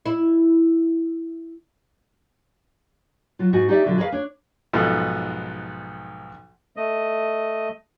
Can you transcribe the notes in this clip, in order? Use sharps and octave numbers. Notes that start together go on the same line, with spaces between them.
E4
F#3 F4
G#2 F#4 G#5
D#4 G4 C#5 D5 E5
B2 D3 F#3 F4
G#4 A#4 B4 C#5 F5
D4 C#5
B1 G#2 F3 B3 A4
A3 D#5